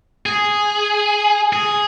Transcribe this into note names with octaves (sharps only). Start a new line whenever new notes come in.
G#4
G#4